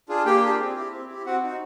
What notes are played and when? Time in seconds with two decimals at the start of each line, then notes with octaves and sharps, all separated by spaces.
0.09 D4 F4 G#4
0.25 A#3 G4 G5
0.42 D4 F4 G#4
0.59 C4
0.75 E4 G4
0.92 C4
1.09 E4 G4
1.26 C4 F#4 F#5
1.43 D#4 F#4